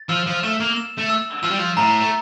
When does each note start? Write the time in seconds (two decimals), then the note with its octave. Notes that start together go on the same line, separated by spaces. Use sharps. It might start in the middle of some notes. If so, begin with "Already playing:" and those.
Already playing: A6
0.09 F3 E6
0.27 F3
0.43 A3 E7
0.60 A#3
0.76 E7
0.98 A3
1.10 E6
1.43 F3 E6
1.51 G3
1.59 F3
1.77 A2 A#5
2.00 A3